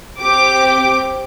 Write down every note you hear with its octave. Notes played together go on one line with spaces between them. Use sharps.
C4 G4 D6